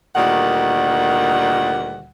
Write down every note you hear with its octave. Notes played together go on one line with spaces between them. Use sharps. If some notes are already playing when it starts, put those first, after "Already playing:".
D2 A#2 D#3 G3 F#5